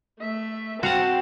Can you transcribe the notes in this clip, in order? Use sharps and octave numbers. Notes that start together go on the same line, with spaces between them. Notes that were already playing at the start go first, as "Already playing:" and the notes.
A3 E5
C4 F#4 F5 F#5 A5